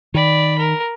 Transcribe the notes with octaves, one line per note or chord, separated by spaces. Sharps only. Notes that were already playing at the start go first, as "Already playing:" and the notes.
D#3 D5 B5
A#4